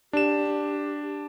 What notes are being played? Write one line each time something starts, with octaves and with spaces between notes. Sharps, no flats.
D4 G4 E7